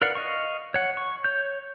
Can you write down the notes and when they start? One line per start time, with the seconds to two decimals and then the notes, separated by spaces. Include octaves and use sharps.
0.02 A#4 B4 D5 F5 F#5
0.15 D#5 F5 C#6
0.74 C#5 F#5
0.97 C#6
1.24 C#5 G6